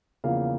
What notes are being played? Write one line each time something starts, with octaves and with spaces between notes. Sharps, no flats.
E2 C#3 F3 A#3 F5